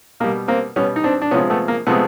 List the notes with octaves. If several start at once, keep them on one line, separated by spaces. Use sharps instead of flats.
B2 G3 A#3
A#3 C4
B2 G3 B3 C#4
D#4
C4 D4
D4
C3 F3 G#3 B3 C#4
A3 B3
A#3
C3 F3 G#3 A3 B3